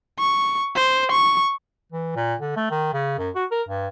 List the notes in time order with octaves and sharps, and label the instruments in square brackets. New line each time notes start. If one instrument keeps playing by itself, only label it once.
[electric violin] C#6
C5
C#6
[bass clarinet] E3
A#2
D3
A3
D#3
C#3
F#2
F#4
A#4
G2